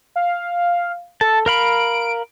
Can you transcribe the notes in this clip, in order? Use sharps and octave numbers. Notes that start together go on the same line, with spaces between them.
F5
A4 A5
A#4 F5 B5 D7